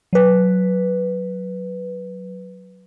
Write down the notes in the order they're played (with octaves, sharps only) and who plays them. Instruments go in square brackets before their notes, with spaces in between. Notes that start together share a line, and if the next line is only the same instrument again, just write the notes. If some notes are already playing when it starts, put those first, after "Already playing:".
[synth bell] F#3 B4